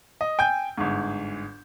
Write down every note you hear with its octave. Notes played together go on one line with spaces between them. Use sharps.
D#5
G5 G#5 G6
G1 G#2